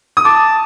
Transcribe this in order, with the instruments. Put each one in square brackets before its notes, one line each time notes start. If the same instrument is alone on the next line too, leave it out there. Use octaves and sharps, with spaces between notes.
[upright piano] D#6
[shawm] A5 [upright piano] D6